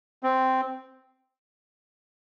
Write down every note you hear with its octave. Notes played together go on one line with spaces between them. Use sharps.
C4